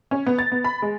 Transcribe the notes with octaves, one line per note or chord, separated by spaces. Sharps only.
C#4
B3
A6
B3
B5
G#3